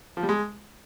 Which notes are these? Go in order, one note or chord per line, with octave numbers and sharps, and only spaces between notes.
F3
G3
G#3